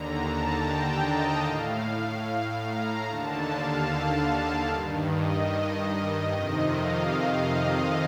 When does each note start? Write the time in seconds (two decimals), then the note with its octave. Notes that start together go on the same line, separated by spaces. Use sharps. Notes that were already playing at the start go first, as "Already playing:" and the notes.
Already playing: D#2 D3 A#5
0.21 A5
0.61 G5
1.03 D#5
1.43 A2 F5
2.66 A#5
3.07 D#2 D3 A5
3.48 F5
3.88 F5
4.69 G2 D#3
5.10 D#5
6.33 F2 C3 D#3 D#5
6.74 F5
7.14 F5
7.55 D#5